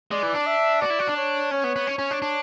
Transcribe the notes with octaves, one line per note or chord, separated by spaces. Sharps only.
G#3 D5
E3
D4
E5
F#4 D5
E4
F#4
D4
C#5
C#4 C#5
B3
B3
C#4
C#4
D4
D4